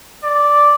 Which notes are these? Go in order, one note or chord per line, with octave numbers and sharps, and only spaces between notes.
D5